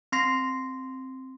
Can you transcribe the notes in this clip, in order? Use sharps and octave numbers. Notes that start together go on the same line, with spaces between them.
C4 C6 A#6 C7